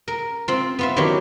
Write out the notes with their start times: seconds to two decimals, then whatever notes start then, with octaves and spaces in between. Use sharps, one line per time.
0.08 A#4
0.48 C4 F4
0.79 B3 F4 E5
0.96 D#3 E3 F#3 C#4 G4